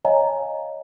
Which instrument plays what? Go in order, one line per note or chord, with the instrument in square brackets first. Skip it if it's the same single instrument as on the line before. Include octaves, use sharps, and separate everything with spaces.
[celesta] C#5 D#5 F5 G#5 A#5